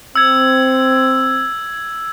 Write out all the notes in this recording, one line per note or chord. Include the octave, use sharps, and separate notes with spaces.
C4 E6 G#6